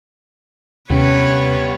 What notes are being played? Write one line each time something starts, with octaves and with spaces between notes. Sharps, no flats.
D#2 C3 G3 B3 C#4 B4 C#5